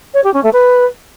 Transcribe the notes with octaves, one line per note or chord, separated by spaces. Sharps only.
C#5
G4
C#4
A3
B4